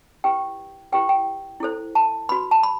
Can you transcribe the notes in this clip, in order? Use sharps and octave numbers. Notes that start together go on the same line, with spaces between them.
E4 G4 B4 G5
E4 G4 B4 G5
G5
E4 A4 C5
A5
F#4 B4 B5
A5
B5